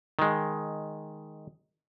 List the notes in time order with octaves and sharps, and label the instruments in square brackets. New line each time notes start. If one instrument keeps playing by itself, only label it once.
[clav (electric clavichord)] D#3 G#3